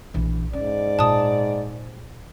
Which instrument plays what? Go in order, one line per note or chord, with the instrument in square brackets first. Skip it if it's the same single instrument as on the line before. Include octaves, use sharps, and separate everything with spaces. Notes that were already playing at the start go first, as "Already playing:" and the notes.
[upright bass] A#1 E3
[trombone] G#2 [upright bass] C#4 [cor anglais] D5
[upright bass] A#2 [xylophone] A5 D#6